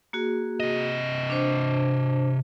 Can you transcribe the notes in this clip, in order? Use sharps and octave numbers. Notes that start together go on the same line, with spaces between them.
A#3 F#4 G#4
C3 D#5
D4 C5